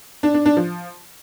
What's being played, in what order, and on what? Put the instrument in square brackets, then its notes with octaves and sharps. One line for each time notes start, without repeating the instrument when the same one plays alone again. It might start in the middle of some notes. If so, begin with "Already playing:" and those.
[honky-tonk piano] D4
D4
D4
F3